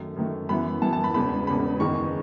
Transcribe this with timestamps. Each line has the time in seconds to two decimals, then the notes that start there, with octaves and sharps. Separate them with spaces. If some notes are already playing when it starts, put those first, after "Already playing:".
Already playing: F#2 D#3 A3
0.16 F#2 D#3 A3
0.49 F#2 E3 B3 B5
0.82 F#2 E3 B3 A5
0.93 A5
1.04 B5
1.14 E1 E2 C#3 B5
1.47 E1 E2 C#3 B5
1.80 F#1 E2 D#3 G#3 C#6